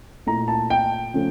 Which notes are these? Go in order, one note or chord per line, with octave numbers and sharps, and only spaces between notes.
A#2 A3 E4 A#5
A5
G5
C#3 F3 A3